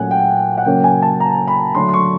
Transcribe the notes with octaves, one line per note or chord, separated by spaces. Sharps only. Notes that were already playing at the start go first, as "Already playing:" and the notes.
Already playing: A#2 F#3 A3 C#4 F#5 G#5
G5
F#5
C#3 F#3 A#3 C#4 G5
G#5
A5
A#5
B5
D3 F#3 A3 D4 C6
C6
C#6